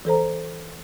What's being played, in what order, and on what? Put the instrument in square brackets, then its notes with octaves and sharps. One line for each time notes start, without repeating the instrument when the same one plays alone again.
[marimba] E3 A4 C5 A#5